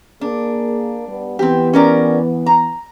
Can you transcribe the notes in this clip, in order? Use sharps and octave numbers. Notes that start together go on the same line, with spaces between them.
A#3 D4 G#4
G3 B3
E3 B3 C4 G4
C#4 A#4 D5
A#5